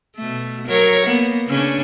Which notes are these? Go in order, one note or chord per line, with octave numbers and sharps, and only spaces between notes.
B2 A3
F#3 A#4 C#5
A#3 B3
C#3 C#4 D4